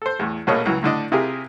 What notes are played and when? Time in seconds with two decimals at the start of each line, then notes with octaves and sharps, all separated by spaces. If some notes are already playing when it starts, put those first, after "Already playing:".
0.02 A4 C5
0.19 E2 A2
0.47 A#1 B2 A3 A#3 C#5 D#5
0.66 C#2 E3 F#3
0.82 A2 D3 D4 D#5
1.12 C3 E4 F4 G4 G#4 A#4